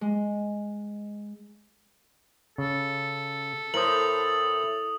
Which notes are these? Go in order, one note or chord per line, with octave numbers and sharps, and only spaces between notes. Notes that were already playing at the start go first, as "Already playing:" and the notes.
G#3
C#3 A4
A2 A#4 C5 D#6 F#7